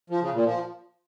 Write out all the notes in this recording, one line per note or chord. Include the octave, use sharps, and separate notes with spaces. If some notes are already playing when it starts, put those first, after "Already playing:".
F3
C#3
A#2
F3